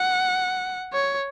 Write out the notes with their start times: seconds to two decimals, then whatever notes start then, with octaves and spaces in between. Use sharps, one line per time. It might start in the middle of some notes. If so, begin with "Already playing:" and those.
Already playing: F#5
0.93 C#5